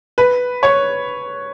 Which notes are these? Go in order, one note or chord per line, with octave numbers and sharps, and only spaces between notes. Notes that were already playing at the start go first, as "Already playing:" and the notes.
B4
C#5